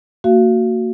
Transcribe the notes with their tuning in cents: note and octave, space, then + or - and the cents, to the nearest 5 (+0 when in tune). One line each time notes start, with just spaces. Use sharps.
A#3 -30 F#4 +0 F5 -30